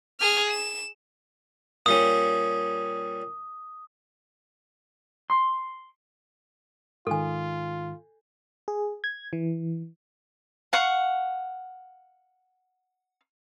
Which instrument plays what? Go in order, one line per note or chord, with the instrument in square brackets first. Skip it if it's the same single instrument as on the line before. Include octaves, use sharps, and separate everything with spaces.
[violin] G#4 F6
E7
[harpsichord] A#2 G3 C#4 [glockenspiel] D#6
[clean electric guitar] C6
[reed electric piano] G#2 D#3 [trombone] F4 [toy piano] A4 G#5
[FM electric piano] G#4
G#6
E3
[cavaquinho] F5 F#5 C#6